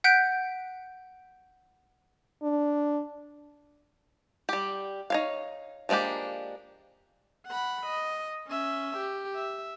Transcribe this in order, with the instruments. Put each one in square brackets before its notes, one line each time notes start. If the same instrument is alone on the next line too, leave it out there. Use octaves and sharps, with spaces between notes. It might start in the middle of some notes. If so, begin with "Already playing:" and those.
[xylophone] F#5 F#6 G6 B6 D7
[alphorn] D4
[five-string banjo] G3 G4
D#4 C#5 F5
F3 G#3 A#3 D4 G4
[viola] F#5 B5
D#5
C#4 E5
G4
E5